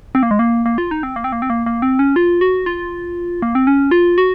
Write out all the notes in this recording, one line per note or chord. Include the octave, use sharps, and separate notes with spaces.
C4
A#3
G#3
A#3
A#3
F4
D#4
C4
A#3
C4
A#3
C4
A#3
A#3
C4
C#4
F4
F#4
F4
A#3
C4
C#4
F4
F#4